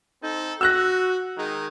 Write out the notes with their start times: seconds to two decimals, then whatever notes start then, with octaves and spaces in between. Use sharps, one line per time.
0.22 C4 D#4 A4
0.61 F#4 E6 F#6 A#6
1.37 D#3 G#3 D#4